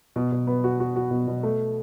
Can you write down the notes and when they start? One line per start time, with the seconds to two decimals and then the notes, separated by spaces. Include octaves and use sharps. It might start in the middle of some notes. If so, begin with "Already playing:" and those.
0.16 B2
0.32 B2
0.47 B3
0.64 F#4
0.80 F#4
0.96 F#4
1.11 B2
1.27 B2
1.43 A3